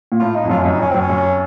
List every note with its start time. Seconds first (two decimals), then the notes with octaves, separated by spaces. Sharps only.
0.12 A#2
0.20 A2 F4
0.35 D#4
0.44 F2
0.50 F#2 F4
0.59 C#4
0.65 F#2 D#4
0.79 F#2 C#4
0.90 F#2 C4
0.99 C#4
1.10 F#2